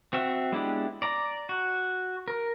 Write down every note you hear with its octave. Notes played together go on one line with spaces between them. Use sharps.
C4 F#4 E5
G#3 B3 D4 E4 G4
D5 A#5
F#4
A#4